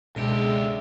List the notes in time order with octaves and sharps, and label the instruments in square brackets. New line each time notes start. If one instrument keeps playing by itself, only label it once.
[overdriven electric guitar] C#2 G4 [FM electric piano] B2 A4 [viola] D3 E5 [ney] G#3